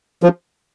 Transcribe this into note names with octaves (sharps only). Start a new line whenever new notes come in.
F3